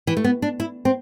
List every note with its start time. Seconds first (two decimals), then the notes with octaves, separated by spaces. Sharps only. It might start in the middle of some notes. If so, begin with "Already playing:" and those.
0.07 E3
0.17 A3
0.24 B3
0.42 D4
0.60 E4
0.85 C4